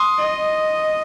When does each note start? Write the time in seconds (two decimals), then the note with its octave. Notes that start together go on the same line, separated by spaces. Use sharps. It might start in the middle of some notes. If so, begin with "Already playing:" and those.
Already playing: C6 D#6
0.18 D#5